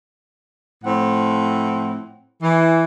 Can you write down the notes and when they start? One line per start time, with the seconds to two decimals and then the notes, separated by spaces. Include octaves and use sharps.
0.84 A2 F3 C4 F#5
2.42 E3